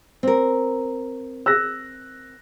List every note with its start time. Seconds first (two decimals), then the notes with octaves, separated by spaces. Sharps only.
0.23 C4 A#4
1.46 E6 F#6 A#6